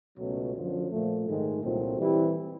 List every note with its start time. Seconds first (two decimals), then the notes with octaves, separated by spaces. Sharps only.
0.18 C#2 B2 F#3 A3 C#4
0.54 F#2 D3 F3
0.90 A#2 F3 A3
1.26 G#2 D#3 G#3
1.62 C2 A#2 F#3 A3 C4
1.98 E3 G3 C4 E4 G4